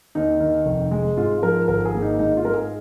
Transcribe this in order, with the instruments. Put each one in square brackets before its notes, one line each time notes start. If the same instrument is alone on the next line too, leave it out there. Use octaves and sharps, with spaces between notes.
[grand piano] D#2 D#4
D#3
F1
G#3
G#2 F4
F3 A#4
G#1 A#4
G#4
A#3
D#4
G#2 D#4
F4
G#3 A#4
G#4